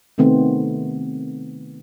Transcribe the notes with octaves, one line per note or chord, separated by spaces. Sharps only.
C3 D#3 A3 B3 C4